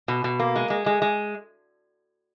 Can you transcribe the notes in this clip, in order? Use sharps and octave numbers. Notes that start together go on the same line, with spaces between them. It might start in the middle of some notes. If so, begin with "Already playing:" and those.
B2
B2
A#3
G#3
G#3
G#3
G#3